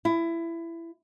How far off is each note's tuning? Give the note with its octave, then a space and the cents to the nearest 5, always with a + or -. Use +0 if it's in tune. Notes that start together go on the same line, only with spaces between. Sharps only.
E4 +20